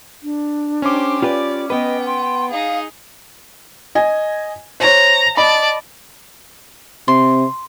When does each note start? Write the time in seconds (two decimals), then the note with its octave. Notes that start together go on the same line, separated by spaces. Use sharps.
0.23 D4
0.82 C#4 G4 C5 D6
1.22 F4 G4 B4 D5
1.70 B3 B4 D#5 G5
2.06 C6
2.51 D#4 G#4 F5
3.95 D#5 G#5
4.80 C5 C#5 A#5
5.37 D5 D#5 A5 B5
7.08 C3 C6